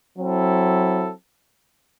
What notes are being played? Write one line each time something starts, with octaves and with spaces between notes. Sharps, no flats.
F#3 C4 E4 A4